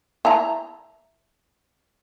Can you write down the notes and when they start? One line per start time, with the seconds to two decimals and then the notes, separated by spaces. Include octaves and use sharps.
0.25 E4 A5 A#5